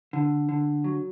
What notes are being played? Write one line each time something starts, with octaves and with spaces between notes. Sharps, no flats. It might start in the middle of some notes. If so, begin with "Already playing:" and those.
D3
D3
F#3